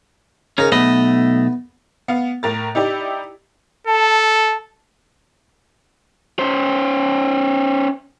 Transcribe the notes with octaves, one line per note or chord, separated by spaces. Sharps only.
C#3 C#4 D#4 A#4
B1 A3 B3 B4 D#5
B3 F5
A2 A#4 A6
D#4 E4 G4 D5
A4 A5
C#4 C5